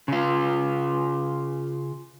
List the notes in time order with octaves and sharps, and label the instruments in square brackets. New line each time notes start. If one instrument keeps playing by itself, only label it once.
[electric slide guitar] C#3 F4